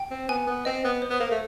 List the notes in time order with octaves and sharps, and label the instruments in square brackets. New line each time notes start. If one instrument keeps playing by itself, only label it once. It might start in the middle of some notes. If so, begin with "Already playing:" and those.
Already playing: [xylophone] G5
[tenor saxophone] C4
[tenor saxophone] B3 [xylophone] G#5
[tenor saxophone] B3
[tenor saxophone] C4 [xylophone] D#5
[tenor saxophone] B3
[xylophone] C5
[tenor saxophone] B3
A#3
A3